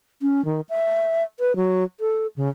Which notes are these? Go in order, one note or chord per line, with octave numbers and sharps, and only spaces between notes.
C#4
D#3
E5
B4
F#3
A4
C#3